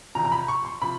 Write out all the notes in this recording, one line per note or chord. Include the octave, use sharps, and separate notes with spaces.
E2 C3 F3 A#5
A#5
B5
C#6
C6
C3 F3 B5